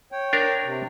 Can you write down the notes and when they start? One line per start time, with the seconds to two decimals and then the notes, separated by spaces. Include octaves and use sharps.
0.12 C#5 G5
0.33 D4 A#4
0.64 C3